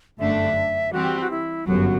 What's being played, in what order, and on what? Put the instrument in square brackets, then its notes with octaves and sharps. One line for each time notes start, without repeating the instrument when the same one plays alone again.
[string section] G1 F#2 D3 A3 D4 [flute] E5
[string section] E3 G3 C4 G4 [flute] F#4
[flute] F#4
E4
[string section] G1 F#2 F#3 [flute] F#4